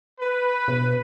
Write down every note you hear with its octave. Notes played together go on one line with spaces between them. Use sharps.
B4
B2